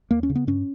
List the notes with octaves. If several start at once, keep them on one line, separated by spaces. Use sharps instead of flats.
D#2 A#3
C#4
C#3
B3
G2 C#4